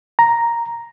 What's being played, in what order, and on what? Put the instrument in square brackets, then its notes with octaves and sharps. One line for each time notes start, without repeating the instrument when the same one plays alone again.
[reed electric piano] A#5